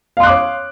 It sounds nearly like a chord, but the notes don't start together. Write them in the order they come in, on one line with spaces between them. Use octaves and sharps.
F5 C6 F#6 D6 C#5